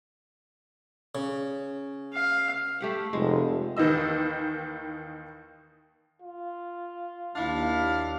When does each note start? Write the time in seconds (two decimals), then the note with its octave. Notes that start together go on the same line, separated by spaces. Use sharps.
1.15 C#3
2.13 F5
2.81 A3 G4 F#5
3.13 F1 G#3
3.77 D#2 D#3 E3 D#5 E6
6.22 F4
7.35 D#2 D4 E4 F5